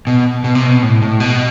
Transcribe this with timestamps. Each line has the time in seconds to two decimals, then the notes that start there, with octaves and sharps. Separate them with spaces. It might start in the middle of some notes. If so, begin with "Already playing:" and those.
0.07 B2
0.44 B2
0.55 C3
0.66 B2
0.82 A2
1.02 A2
1.20 B2